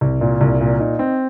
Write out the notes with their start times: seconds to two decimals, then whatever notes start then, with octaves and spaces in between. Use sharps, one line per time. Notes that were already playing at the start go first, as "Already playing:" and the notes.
0.01 C2
0.21 A#2
0.41 C2
0.60 A#2
0.80 D#4
0.99 C4